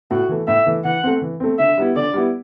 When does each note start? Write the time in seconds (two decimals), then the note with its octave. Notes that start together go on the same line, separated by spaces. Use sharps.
0.11 A2 F#4
0.29 E3 A3
0.47 A2 E5
0.66 E3 A3
0.84 E3 F#5
1.04 A3 C4
1.22 E3
1.40 A3 C4
1.58 D3 E5
1.78 G3 B3 E4
1.95 D3 D5
2.14 G3 B3 E4